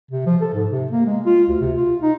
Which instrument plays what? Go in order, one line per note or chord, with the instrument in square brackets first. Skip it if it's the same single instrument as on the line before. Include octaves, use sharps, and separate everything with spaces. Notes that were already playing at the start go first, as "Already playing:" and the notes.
[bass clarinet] C3
F3
A4
G#2
C3
A#3
G#3
F4
D2
C3
F4
D#4